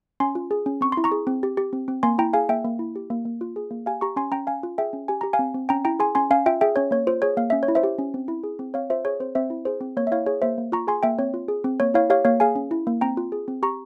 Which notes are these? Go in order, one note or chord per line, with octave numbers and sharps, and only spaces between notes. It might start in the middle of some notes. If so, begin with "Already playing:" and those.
C#4 G#5 C6
F4
G#4
C#4
C4 C#6
E4 C6
A#5 C#6
G#4
C4
G4
G4
C4
C4
A#3 G#5 C6
E4 G5 A#5
G#4 F5 G#5
A#3 E5 G5
A#3
E4
G4
A#3
A#3
F4
G#4
A#3
G4 F5 G#5
G4 A#5 C#6
C#4 G#5 C6
C#4 G5 A#5
C#4 F5 G#5
F4
G#4 E5 G5
C#4
G4 G#5
G4 A#5
F5 G#5
C4
C4
C#4 G5 A#5
E4 G5 A#5
G#4 G#5 C6
C#4 G#5 C6
C#4 F5 G#5
F4 E5 G5
G#4 E5 G5
C#4 C#5
A#3 C#5
F4 C5
G#4 C#5
A#3 F5
C#4 E5
C#5
E4
C5 E5
G4
C#4
C4
E4
G#4
C4
C4 C#5 F5
F4 C5 E5
G#4 C#5
C4 C5
C4 C5 E5
E4
G#4 C5
C4
A#3 C#5
E5
E4 C#5 F5
G#4 C#5
A#3 C5 E5
A#3
F4 A#5 C#6
G#4 G#5 C6
A#3 E5 G5
C4 C#5
F4
G#4
C4
A#3 C#5
E4 C#5 F5
G4 C#5 F5
A#3 C#5 F5
G#4 F5 G#5
C#4
E4
A#3
C4 G5 A#5
F4
G#4
C4
G4 A#5 C#6